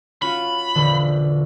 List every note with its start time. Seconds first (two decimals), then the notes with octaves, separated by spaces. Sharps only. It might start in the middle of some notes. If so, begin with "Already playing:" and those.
0.22 C#4 F4 F#4 B5
0.75 E1 A#1 D3